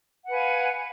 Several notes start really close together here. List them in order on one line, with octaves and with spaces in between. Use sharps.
F#5 B4 G#5 F5